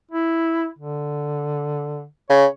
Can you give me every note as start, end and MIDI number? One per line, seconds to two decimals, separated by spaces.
0.11 0.67 64
0.79 2.04 50
2.30 2.46 49
2.30 2.47 73